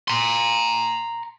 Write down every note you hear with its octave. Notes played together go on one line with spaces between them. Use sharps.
A#5 C6